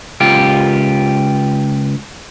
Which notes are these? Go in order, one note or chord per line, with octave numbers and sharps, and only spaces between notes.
C#2 F4 G4